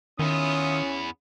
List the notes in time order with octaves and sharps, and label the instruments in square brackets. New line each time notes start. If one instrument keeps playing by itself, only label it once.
[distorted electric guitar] E2 B3 [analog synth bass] D#3 [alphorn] C#4 [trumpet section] F4 E5 D#6